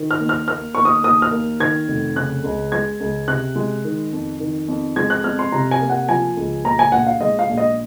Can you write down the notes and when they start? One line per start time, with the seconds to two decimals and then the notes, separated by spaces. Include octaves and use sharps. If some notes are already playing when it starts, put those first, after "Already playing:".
Already playing: D#3
0.11 F6
0.20 D#2
0.29 F6
0.48 A#3 F6
0.75 D#2 C#6
0.85 D#6
1.03 D#2 D#6
1.22 F6
1.31 A#3
1.60 D#3 G#6
1.88 F1
2.16 C#3 F#6
2.44 C#2
2.72 G#3 G#6
3.00 C#2
3.28 C3 F#6
3.56 G#3
3.84 D#3
4.13 F2
4.40 D#3
4.68 F2
4.96 G#3 G#6
5.10 F#6
5.24 F2 F6
5.39 C6
5.52 C3 A#5
5.71 G#5
5.80 A#3
5.90 F#5
6.09 F3 G#5
6.37 C#2
6.64 A#2 A#5
6.79 G#5
6.92 A#1 F#5
7.07 F5
7.21 G#3 D#5
7.39 F5
7.49 A#1
7.58 D#5